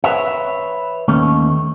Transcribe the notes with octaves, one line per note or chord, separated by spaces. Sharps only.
B4 C#5 E5
D#2 A3 C#4